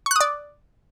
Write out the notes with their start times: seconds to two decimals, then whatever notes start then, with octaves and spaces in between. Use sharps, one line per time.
0.06 C#6
0.11 F#6
0.16 D#6
0.21 D5